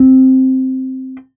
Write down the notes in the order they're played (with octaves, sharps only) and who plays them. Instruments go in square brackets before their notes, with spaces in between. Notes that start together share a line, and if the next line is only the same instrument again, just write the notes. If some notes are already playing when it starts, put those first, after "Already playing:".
Already playing: [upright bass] C4